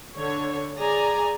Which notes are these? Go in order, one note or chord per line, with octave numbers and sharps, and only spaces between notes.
D3 C#5
G#4 D5 G#5 A#5